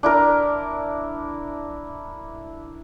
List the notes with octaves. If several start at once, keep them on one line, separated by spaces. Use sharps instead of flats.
D4 E4 A#4